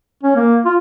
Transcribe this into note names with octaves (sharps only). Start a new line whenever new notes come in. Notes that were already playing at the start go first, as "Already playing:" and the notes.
C#4
A#3
F4